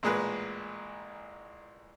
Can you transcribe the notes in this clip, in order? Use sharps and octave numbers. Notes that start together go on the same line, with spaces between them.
A1 A#2 G#3 G#4 B4